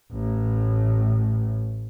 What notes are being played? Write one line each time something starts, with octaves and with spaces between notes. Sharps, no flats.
A1 A2